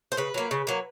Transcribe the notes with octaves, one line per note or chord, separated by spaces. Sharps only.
C5
C#3 B4
F#3 A#3
C#3
F#3 A#3